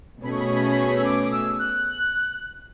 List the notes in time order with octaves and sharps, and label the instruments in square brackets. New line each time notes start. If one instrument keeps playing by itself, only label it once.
[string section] B2 A3 C#4 G#4 [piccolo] B5
[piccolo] C#6
B5
C#6
B5
C#6
B5
C#6
B5
E6
D6
D6
E6
F#6